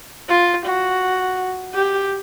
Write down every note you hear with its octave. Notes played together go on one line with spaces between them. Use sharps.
F4
F#4
G4